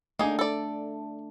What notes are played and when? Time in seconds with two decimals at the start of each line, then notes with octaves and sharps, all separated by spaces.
0.19 A3 A#3 D4 D#4 G#4
0.39 A4 D5